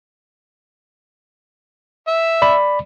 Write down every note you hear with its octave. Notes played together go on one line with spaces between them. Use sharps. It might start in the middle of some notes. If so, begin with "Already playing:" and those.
E5
D5 B5